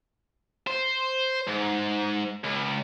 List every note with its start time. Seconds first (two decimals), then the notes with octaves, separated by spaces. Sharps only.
0.67 C5
1.48 G#2
2.44 C#2